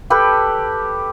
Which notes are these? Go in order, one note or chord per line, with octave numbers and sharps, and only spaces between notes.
G4 A4 B4